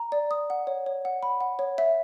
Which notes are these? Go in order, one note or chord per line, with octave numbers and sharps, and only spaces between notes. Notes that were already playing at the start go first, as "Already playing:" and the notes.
Already playing: A#5
D5
D#6
F#5
C#5
C#5
F#5
B5
F#5
C#5
E5